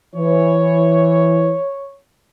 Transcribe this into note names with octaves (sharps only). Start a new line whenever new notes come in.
E3 C#5